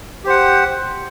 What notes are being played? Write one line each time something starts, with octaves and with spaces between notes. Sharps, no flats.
G4 C5 F#5